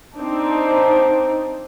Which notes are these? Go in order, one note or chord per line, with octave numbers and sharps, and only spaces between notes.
C4 D4 D#4